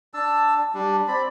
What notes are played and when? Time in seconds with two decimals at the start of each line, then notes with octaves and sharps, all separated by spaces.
0.14 D4 A5 E6
0.74 G3 D4
1.08 C4 D5 B5